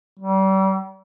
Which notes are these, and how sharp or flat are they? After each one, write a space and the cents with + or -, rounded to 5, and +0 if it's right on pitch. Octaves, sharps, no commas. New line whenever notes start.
G3 -35